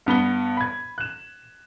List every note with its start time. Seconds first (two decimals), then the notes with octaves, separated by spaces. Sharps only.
0.06 G2 B3 B5 G7
0.57 B5 G#6
0.98 F#6 E7